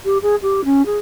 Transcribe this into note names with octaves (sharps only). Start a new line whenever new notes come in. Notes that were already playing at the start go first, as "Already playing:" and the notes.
G4
G#4
G4
C#4
G#4